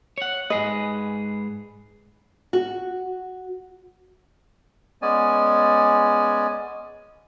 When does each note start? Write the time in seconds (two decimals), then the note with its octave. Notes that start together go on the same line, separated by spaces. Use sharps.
0.18 C#5 F#5
0.50 G#2 G#4 B4 D#5
2.53 F#4
5.02 G#3 B3 C#4 D5 G#5